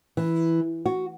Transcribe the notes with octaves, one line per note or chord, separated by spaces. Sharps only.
E3
F#4